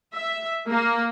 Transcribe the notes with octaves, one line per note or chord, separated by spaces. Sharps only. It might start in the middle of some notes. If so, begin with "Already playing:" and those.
E5
A#3